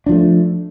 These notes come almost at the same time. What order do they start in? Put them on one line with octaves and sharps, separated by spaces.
D4 F3 A3